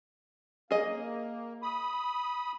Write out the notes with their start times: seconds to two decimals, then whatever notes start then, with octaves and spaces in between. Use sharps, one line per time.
0.71 A#3 G#4 D#5
1.62 B5 D#6